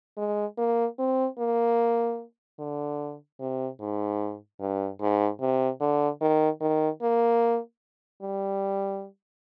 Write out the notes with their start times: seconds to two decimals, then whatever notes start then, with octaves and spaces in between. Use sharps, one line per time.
0.17 G#3
0.58 A#3
0.98 C4
1.39 A#3
2.59 D3
3.40 C3
3.80 G#2
4.60 G2
5.00 G#2
5.41 C3
5.81 D3
6.21 D#3
6.61 D#3
7.02 A#3
8.22 G3